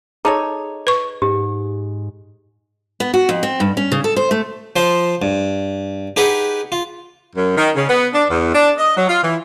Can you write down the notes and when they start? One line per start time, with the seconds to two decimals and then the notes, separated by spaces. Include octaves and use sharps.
0.25 D#4 G#4 A4 C#5
0.87 B4 C#6
1.22 G#2 G4
3.00 B3
3.14 F#4
3.29 F2
3.43 C4
3.60 G2
3.77 C#4
3.92 C#3
4.04 A4
4.16 C5
4.31 A3
4.76 F3 C5 C6
5.22 G2
6.16 D#4 G4 G#4 B4 F#5
6.72 F4
7.36 F#2
7.58 D#3
7.76 C#3
7.89 B3
8.13 D4
8.30 E2
8.54 D4
8.78 D#5
8.97 F#3
9.09 F4
9.23 E3